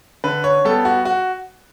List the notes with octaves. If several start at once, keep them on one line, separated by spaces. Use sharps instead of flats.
D3 B4
C#5
G3 B3 A4
F#4
F#4